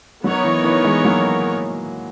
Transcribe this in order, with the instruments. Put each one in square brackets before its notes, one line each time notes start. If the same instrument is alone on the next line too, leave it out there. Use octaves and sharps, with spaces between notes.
[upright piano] F#3 [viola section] B3 D#4 A#4 C#5
[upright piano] E3
E3
E3 G#3
F#3 A#3